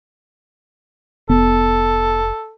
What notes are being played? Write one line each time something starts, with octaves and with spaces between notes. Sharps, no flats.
F1 B3 A4